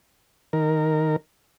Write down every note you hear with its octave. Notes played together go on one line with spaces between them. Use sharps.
D#3 A#4